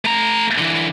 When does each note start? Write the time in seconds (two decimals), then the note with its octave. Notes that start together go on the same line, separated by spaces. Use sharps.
0.05 A3 A#5
0.58 D3 E3